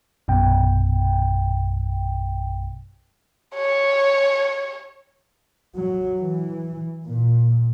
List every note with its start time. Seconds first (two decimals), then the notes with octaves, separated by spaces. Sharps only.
0.28 A#1 F#2 B2 G5
3.55 C#5
5.75 F#3
6.17 E3
7.04 A#2